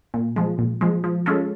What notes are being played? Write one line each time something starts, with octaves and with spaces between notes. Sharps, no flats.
A#2
F3 G#3
A#2
F3 G#3
F3
G#3 C#4 F4 A4